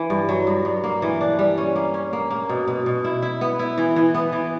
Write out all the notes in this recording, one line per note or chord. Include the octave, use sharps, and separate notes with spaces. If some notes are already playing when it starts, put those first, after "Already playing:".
Already playing: E3
G2
F#3
G2
G2
A#3
E3
D4
G3
C#4
A#3
C#4
A#3
A#3
B2
B2
B2
E4
E4
B3
E4
E3
E3
B3
E3